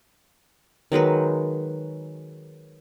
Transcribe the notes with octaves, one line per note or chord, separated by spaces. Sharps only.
D#3 F#3 G#3 B4